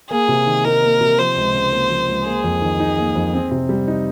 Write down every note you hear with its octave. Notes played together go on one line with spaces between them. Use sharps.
A#3 G#4
C3
D#3
D#4 A#4
A#3
C3
F3 C5
C#2
C#3
A#3
F3
C#2
A#3 G#4
F2
D#3
D#4
A#3
F2
C4
C3
G3
D#4